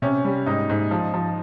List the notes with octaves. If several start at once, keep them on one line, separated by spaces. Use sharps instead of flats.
C3 C#4
G3
G#2 D#4
G#2
F3
F3